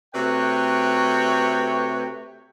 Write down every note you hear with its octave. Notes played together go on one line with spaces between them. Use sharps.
C3 A3 F#4 B4 C#5 G5